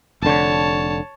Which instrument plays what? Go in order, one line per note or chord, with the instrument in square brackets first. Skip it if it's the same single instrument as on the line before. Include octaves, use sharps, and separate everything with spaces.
[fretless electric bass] F1 D3 [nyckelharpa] C#5 A5